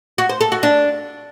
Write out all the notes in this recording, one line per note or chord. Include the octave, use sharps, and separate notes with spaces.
F#4
C5
A4
F#4
D4